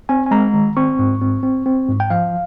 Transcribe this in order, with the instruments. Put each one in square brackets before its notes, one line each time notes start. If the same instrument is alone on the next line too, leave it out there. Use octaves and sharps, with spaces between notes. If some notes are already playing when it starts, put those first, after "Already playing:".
[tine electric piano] C4 G#5
G#5
G#3 A#5
D#3
C4 C#6
G#2
C4
C4
C4
G#2
G5
F3 F5